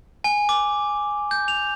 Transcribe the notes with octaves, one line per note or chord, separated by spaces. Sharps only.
G#5
D6
G6
F7